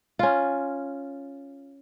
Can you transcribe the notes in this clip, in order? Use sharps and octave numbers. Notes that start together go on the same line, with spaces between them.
C#4 F4